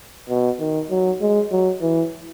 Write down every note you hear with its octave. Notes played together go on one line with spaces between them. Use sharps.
B2
D#3
F#3
G#3
F#3
E3